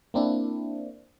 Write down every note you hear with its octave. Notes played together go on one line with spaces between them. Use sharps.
A#3 C4 D4 E4